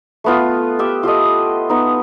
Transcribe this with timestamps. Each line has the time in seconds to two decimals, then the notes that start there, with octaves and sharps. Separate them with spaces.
0.24 A3 B3 F4
0.79 G4 E5 G5
1.03 F4 G4 A4 D#5
1.69 B3 D#4